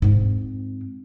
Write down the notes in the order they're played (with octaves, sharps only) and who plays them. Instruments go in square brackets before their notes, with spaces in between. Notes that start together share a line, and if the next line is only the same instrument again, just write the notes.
[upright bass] G#2 C4